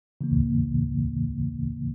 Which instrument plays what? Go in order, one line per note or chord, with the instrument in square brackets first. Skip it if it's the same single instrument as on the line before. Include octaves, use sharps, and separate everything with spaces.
[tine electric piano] C#3 E3 A#3